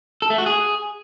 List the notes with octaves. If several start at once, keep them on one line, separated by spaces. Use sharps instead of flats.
A4
A3
F#4
G#4